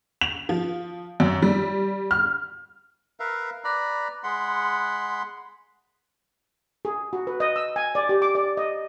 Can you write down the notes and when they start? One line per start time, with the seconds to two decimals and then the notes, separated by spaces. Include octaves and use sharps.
0.21 F7
0.49 F3
1.20 F#2
1.42 G3
2.11 F6
3.20 A#4 B4 E5 F5
3.64 B4 D5 A#5 B5
4.24 G#3 F#5 B5 C6
6.85 G#4
7.13 F#4
7.27 B4
7.40 D#5
7.56 E6
7.76 G#5
7.95 D5
8.09 G4
8.22 D6
8.35 D5
8.57 D#5